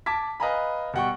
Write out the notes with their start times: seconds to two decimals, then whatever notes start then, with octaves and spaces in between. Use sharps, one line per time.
0.06 A5 D6 G#6 B6
0.40 B4 D#5 F5 G#5 A#5 B5
0.93 B2 G3 F#5 G5 C#6